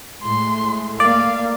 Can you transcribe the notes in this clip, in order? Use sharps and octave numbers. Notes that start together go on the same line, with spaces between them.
A2 G#3 A3 C6
A#3 D5 F5